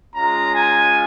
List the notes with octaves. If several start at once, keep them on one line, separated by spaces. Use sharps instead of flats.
G#3 C#4 F4 A#5
G#5